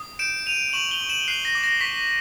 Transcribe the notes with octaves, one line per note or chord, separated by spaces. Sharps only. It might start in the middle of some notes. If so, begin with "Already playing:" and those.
Already playing: D#6
G6 D7 E7
G6 D#7 F7
C#6 E7 F#7
F7 G7
C#6
E7 F#7
F#6 C7
A#6
D6
A#6
C#6 B6